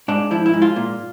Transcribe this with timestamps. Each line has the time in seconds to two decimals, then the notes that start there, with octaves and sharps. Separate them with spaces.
0.08 G#2 D4
0.31 F3 E4
0.46 E4
0.53 G#2
0.62 F4
0.76 A#2